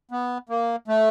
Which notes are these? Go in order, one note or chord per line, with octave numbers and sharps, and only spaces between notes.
B3
A#3
A3